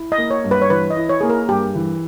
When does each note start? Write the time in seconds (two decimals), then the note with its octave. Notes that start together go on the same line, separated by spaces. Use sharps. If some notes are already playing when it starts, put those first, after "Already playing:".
Already playing: E4
0.12 D#5
0.18 A#3
0.31 C#5
0.44 G2
0.51 B4
0.62 C#5
0.70 E3 B4
0.90 D#5
0.97 E4
1.09 C#5
1.21 A#3 G#4
1.30 A#4
1.49 G2 G4
1.75 E3